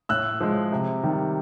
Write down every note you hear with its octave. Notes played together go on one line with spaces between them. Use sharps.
A2 E6 F#6
F3 G#3
C3
D#3 G3